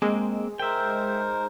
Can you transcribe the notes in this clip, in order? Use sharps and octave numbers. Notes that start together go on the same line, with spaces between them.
G#3 A#3 C4
D#4 A#4 C5 E5 G5